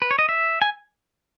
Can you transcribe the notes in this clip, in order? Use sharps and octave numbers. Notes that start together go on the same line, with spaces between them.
B4
C#5
D#5
E5
G#5